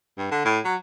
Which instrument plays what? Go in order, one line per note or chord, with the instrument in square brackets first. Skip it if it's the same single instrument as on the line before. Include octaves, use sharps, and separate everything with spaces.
[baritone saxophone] G2
D3
A2
F#3